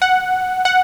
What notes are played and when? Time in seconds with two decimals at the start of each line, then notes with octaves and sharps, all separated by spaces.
0.02 F#5
0.65 F#5